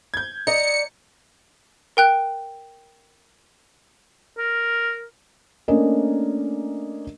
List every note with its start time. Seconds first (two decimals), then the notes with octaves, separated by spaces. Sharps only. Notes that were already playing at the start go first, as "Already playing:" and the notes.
0.14 G6 G#6
0.47 D5 D#5 A#5 C#7
1.97 A#4 G5 F#6
4.38 A#4
5.68 A3 A#3 C#4 D4 A#4 D#5